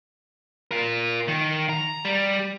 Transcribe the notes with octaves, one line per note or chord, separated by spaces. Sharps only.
F4 A#4
D#3
A#5
G3